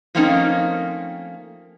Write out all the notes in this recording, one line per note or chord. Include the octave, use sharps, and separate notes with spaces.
F3 A3 A#3 C4 C#4 D#4